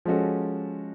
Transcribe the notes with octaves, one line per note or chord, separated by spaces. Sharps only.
F3 G#3 C#4 F#4 A4